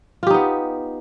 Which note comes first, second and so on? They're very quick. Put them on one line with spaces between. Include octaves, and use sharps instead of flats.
F4 G4 D#4 B3